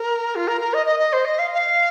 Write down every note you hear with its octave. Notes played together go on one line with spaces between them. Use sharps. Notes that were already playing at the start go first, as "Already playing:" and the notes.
Already playing: A#4
F4
A#4
A#4
D#5
D#5
D#5
C5
D#5
F5
F5